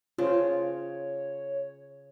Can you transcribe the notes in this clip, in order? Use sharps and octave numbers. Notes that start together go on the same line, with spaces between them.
C#3 F4 C5 C#5